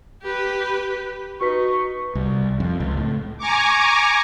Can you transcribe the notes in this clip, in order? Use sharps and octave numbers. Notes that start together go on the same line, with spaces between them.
G4 B4
D#4 F#4 B4 C#6 B6
C2
F2
C#2
A2
G#5 A#5 C#6 D6